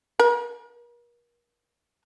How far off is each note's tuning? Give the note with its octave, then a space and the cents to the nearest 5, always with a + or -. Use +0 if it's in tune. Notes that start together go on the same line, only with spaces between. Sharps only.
A#4 +40